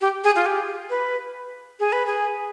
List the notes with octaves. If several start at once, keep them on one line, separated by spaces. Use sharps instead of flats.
G4
G#4
F4
G4
B4
G#4
B4
G#4